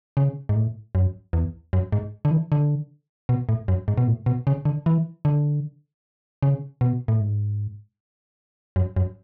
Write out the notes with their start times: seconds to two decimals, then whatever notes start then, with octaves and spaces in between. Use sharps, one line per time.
0.17 C#3
0.49 G#2
0.55 A2
0.95 F#2
1.33 E2
1.73 F#2
1.92 G#2
2.25 D3
2.31 E3
2.52 D3
3.29 B2
3.49 A2
3.68 F#2
3.88 G#2
3.98 B2
4.08 A2
4.26 B2
4.47 C#3
4.65 D3
4.86 E3
5.25 D3
6.43 C#3
6.81 B2
7.08 A2
7.20 G#2
8.76 F#2
8.96 F#2